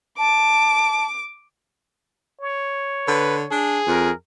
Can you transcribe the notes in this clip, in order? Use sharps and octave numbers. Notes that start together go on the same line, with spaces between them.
A5 D6
C#5
D3 B4
D4 G#4
F2 A#4